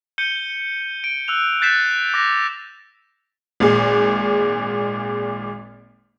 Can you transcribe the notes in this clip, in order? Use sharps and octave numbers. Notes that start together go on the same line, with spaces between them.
G6 C#7 D#7 G7
D7
E6 F#6 F7
F#6 G6 A6 B6 C7 E7
D6 A#6
G#1 A#2 G#3